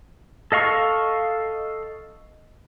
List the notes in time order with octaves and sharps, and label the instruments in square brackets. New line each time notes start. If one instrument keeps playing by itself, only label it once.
[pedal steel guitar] A4 D#5 F5 C#6